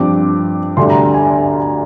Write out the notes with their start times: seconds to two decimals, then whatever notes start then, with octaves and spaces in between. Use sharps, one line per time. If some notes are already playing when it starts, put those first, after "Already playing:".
Already playing: G2 F3 C4 D6
0.77 D2 D3 G3 C6
0.90 A#5
1.14 G#5
1.27 D5